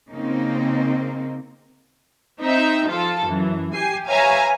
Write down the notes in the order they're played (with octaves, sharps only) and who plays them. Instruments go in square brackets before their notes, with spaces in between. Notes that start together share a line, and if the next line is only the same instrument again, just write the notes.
[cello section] C#3 A#3 C4 D#4
[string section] C4 D#4 E5
F3 F4 A4
F#2 E3
G4 G#5 C7
B4 C#5 E5 F5 G#5 A#5